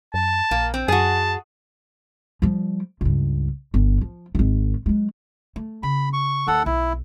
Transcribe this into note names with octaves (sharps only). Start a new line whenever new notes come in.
F#2 A5
A#1 A#3
C4
F#2 F#4 G#4 A5
F3 G3
C#2 G2
G1
F3
G#1 D#3
F#3 G#3
A3
C#3 B5
C#6
D#2 A#3 A4 F#5
B1 E4